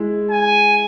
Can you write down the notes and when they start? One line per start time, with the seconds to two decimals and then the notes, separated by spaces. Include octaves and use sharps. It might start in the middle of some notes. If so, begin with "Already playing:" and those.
Already playing: G#3 E4
0.30 G#5